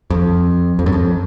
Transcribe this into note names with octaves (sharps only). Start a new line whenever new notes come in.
F2
F2
F#2
F2